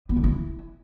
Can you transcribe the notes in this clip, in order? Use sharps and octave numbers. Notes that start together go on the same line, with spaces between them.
B3
D3
E4